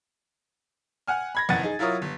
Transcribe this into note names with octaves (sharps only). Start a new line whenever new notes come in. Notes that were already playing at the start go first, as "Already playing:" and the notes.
F#5 G#5 F6
B5 G#6 A#6
F#1 F2 E3 F#5 A6 D#7
D#4 G#4
F#3 E4 F4 A#4 C#5 D#6
G1